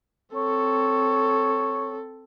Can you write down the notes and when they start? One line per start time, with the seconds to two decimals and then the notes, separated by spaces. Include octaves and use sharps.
0.35 C4 A4 C#5